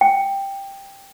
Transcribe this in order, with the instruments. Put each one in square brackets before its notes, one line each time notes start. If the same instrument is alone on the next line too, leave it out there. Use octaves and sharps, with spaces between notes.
[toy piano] G5